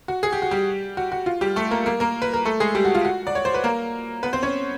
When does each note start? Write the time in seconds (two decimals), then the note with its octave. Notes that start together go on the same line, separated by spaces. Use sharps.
0.08 F#4
0.23 G#4
0.33 G4
0.42 F#4
0.51 G3 G4
0.97 F#4
1.12 F#4
1.26 F4
1.41 G3 G4
1.56 A3 A4
1.71 A#3 A#4
1.86 A#3 A#4
2.00 A#3 A#4
2.22 B4
2.33 A#4
2.45 A3 A4
2.60 G#3 G#4
2.75 G3 G4
2.85 F#4
2.95 F4
3.05 F#4
3.27 D5
3.35 C#5
3.45 C5
3.54 B4
3.64 A#3 A#4
4.23 B3 B4
4.33 C4 C5
4.43 C#4 C#5